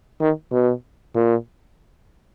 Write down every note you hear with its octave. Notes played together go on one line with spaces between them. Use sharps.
D#3
B2
A#2